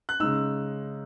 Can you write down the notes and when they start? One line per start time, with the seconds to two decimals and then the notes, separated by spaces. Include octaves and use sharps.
0.09 F#6
0.20 C#3 G#3 D#4 E6